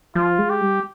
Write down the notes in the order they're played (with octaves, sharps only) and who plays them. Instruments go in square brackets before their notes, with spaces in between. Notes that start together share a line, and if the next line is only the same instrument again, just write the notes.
[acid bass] F3 [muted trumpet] F4
[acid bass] G#3
[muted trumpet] G4
[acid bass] G3